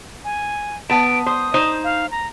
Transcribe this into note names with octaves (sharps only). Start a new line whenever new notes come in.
G#5
B3 A5 D7
C5 D#6
D#4 C5
F5
A#5